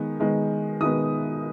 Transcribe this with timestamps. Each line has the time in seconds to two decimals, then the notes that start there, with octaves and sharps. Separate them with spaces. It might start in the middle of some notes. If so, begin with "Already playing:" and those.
Already playing: D#3 G#3 B3
0.20 D#3 G#3 B3
0.80 D#3 G#3 B3 D#6